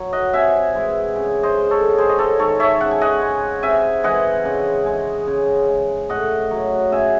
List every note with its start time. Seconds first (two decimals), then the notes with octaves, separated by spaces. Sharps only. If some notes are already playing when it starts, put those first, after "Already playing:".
Already playing: F#3
0.13 D#5 F#5
0.33 C3 E5 G#5
0.75 E3 G#3
1.16 C#3
1.43 C5 D#5
1.57 G#3
1.71 A4 C#5
1.98 C3 G#4 C5
2.09 D#5
2.19 A4 C#5
2.39 D#3 G#3 A4 C#5
2.60 C#5 E5
2.80 C#3 F#5
2.91 G#5
3.01 D#5 F#5
3.22 G#3
3.63 C3 E5 G#5
4.04 E3 G#3 D#5 F#5
4.45 C#3
4.86 G#3
5.27 C#3
5.69 G#3
6.09 A2 D#5 F#5
6.51 F#3
6.92 C#3 E5 G#5